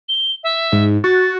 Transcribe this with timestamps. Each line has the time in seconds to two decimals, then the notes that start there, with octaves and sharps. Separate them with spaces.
0.09 G7
0.44 E5
0.72 G#2
1.04 F#4 A6